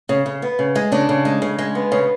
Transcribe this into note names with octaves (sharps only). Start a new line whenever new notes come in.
C#3
C#3
B3
C#3
G#3
C#3 D4
C#3
G#3
C#3
G#3
B3
C#3